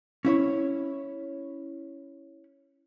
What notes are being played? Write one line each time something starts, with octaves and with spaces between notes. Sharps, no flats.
C#4 E4 C#5